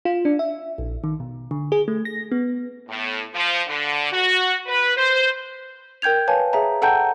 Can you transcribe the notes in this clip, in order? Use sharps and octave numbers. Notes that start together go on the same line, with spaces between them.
F4
D4
E5
A#1
D#3
B2
D3
G#4
A3
A#6
B3
A2
F3
D3
F#4
B4
C5
A#4 G5 G6 G#6 F7
B4 C#5 F5 G#5 A5
G#4 C#5 E5 A#5
A4 F#5 G5 A5 A#5 G6